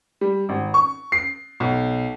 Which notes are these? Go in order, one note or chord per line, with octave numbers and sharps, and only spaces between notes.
G3
G#1
C#6
C7
B1